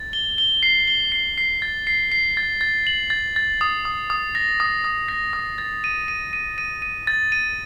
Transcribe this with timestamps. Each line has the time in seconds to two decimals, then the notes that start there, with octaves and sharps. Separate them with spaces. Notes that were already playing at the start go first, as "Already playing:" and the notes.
Already playing: A6
0.13 G7
0.38 G7
0.63 C7
0.88 G7
1.12 C7
1.38 C7
1.62 A6
1.87 C7
2.12 C7
2.37 A6
2.61 A6
2.87 F#7
3.10 A6
3.36 A6
3.61 D#6
3.85 D#6
4.10 D#6
4.35 A#6
4.60 D#6
4.84 D#6
5.08 A#6
5.33 D#6
5.58 A6
5.84 D#7
6.08 D#7
6.33 D#7
6.58 D#7
6.82 D#7
7.07 A6
7.32 D#7